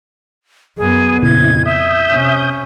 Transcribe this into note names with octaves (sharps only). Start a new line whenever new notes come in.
F#2 B3 G#4
F2 A#2 C#3 E4 G#6
E5 D#6 G6
C3 C#4